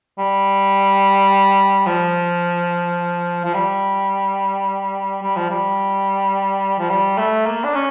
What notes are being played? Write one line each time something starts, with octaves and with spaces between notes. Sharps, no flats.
G3
F3
F3
G3
G3
F3
G3
F3
G3
A3
A#3
D4
C#4